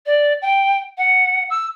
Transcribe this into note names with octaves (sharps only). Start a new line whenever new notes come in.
D5
G5
F#5
E6